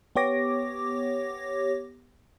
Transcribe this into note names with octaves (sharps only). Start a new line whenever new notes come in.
B3 G4 C#5 D6 A#6